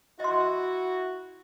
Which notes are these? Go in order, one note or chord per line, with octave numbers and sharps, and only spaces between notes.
E4 F#4 D#5 C6